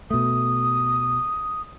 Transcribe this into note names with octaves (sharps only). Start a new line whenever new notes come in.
B2 A3 D#6